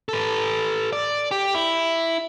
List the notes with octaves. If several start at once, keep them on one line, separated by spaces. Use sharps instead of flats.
A4 B4
D5
G4
E4